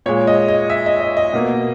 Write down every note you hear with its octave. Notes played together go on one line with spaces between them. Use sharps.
A#2 G#3 C#5
D#5
D#5
E5
D#5
D#5
D#5
B2 A#3